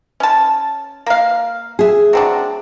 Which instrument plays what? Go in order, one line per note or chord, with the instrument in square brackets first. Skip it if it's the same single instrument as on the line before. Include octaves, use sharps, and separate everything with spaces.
[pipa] C#4 A5
A#3 F5
[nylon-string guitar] G#4 E5
[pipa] F#3 C4 D4